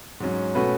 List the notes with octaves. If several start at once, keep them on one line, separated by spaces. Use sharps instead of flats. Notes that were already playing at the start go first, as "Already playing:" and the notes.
G#2 F#3 C#4
B2 A3 C#4 F#4 B4